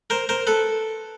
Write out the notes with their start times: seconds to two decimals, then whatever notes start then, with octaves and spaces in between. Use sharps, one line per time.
0.10 A#4 C5
0.29 A#4 C5
0.47 A4 B4